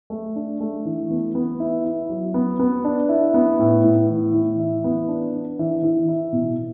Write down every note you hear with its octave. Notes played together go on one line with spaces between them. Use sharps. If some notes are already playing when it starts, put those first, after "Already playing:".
A3
D4
A3
E3
B3
B3
E4
E4
F#3
B3
B3
D4
E4
B3
A2
A2
E3
E3
E4
B3
D4
D4
E3
E3
E4
B2